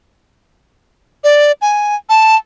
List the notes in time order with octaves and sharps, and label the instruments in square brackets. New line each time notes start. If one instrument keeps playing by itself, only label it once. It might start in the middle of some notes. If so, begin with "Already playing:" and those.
[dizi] D5
G#5
A5